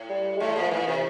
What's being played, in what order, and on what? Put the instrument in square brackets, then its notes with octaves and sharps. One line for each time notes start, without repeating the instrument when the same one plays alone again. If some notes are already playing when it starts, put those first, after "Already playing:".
Already playing: [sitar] A2
[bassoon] G3
G#3
[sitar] A2 [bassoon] A3
[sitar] A#2 [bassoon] F3
[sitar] A#2 [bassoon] E3
[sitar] C3 [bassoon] E3